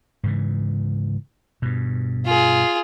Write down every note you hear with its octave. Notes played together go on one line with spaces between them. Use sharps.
G#2 C#3 E3
G2 B2
F4 G#4